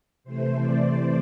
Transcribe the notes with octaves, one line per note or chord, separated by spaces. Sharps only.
C3 E3 A3 C5
D5